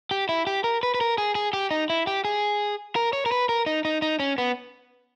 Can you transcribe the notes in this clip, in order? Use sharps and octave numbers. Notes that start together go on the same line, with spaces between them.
G4
E4
G4
A#4
B4
B4
A#4
G#4
G#4
G4
D#4
E4
G4
G#4
A#4
C#5
A#4
B4
A#4
D#4
D#4
D#4
C#4
B3